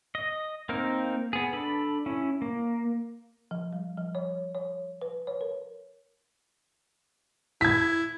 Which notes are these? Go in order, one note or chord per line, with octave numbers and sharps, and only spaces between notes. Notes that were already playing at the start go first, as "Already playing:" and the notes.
D#5
A#3 C4 D#4 A#4
B3 G#4
D4 A4 B5
C#4 E4
A#3
F3
G3
F3
C#5
C#5
B4
C#5
A#4
E4 G#6 B6